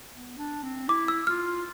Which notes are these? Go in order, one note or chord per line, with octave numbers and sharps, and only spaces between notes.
B3
D4
C4
E4 D6
E6
F4 F6